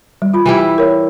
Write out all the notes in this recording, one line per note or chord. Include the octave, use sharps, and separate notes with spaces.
G3
F4 B5
E3 G3 E4
A#4 C#5